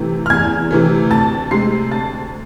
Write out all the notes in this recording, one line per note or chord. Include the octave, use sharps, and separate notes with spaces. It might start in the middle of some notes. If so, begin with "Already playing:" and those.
Already playing: C3 E3 A3
F6
E2 G#5 G#6
C3 E3 A3
D2 A5 A6
C3 G#3 C6 C7
D2 A5 A6